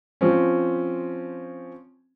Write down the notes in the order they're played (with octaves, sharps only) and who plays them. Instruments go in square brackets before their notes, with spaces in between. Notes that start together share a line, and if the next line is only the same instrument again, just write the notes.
[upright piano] F3 C4 C#4